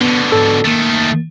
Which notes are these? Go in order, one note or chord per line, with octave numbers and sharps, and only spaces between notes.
B2 D3 B3
G#2 A4 E6
D#3 A3 A#3 A6